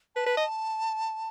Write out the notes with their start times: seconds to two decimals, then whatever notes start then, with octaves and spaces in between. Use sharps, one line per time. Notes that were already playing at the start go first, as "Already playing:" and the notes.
0.16 B4 A5
0.26 B4
0.37 D#5